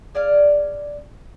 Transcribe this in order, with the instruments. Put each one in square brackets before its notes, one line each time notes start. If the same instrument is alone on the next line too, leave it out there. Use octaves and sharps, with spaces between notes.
[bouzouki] G#4 D5 D#5 F5